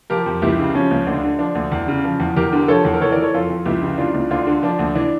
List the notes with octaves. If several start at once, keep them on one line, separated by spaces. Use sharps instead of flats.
F3 G4 A#4
F2
C#2 E4 G4
C#3
F3 C#4
C#2
D2 D4
D3
F3 D4
D2
E2
C#3
F3
E2
E2 G4 A#4
D3
F3 A4 C#5
E2
A#4
E3 A4 C#5
E3 A#4 D5
A4 C#5
F2 F4 A4
F2
C#2 E4 G4
C#3
E3 D4 F4
C#2
D2 D4 F4
D3
F3 D4
D2
E3 D4